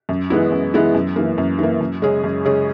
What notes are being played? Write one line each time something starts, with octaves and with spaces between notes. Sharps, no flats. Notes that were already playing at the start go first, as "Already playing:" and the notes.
F#2
E3 G#3 B3 E4
F#2
E3 G#3 B3 E4
F#2
E3 A#3
F#2
E3 A#3
F#2
C#3 G#3 C#4 G#4
F#2
C#3 G#3 C#4 G#4